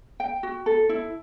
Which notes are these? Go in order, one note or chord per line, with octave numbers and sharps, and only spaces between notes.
G5
F#4
A4
E4